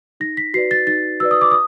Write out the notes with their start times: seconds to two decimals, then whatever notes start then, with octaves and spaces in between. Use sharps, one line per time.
0.20 D#4 A#6
0.37 B6
0.54 F#4 B4 D5 C7
0.71 A6
0.87 D#4 A6
1.20 F#4 B4 D5 E6
1.31 D#6
1.41 D6
1.51 D#6